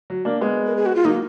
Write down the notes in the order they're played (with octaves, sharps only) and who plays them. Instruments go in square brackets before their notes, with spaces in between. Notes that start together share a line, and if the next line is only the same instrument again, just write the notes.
[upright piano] F#3
A#3 D4
G#3 B3
[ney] A#4
G#4
F#4
F4
[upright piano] F#3 A#3 [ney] D#4